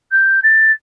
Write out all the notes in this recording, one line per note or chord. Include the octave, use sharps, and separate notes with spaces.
G6
A6